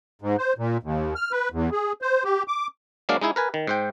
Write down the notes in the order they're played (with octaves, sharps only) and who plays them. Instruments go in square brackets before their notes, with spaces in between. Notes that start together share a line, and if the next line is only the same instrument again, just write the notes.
[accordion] G#2
C5
A#2
D#2
F6
B4
E2
G#4
C5
G4
D6
[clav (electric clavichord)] F#3 G#3 A#3 D4 D5 F5
G#3 D#4 E4 G#4
A#4 B4 G#5
D#3
G#2 C5 G5